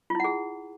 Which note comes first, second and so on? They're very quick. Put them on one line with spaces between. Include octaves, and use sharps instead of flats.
F4 E4 F#5 G#4